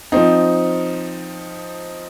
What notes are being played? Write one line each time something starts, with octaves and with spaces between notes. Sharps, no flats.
F3 C4 D#4